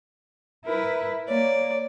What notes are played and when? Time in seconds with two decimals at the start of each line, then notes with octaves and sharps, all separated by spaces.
0.66 E4 A#4 B4
1.29 A#3 C#5 D5